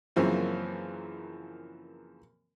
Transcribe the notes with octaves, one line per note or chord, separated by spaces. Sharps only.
F#2 C#3 E3 F3 A#3 C4